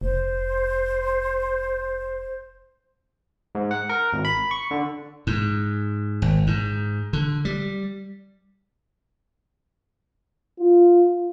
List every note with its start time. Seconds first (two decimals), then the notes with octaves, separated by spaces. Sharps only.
0.01 F1 C5
3.55 G#2
3.71 F#5
3.89 A#4
4.13 G#1
4.25 B5
4.51 C#6
4.71 D3
5.27 G#2
6.22 G#1
6.47 G#2
7.13 D3
7.45 G3
10.59 F4